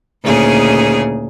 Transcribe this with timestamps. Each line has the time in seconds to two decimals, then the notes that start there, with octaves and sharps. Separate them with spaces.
0.23 D2 A#2 C#3 D#4 G#4